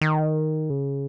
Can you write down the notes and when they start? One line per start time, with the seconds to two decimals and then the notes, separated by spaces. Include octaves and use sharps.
0.01 D#3
0.70 C#3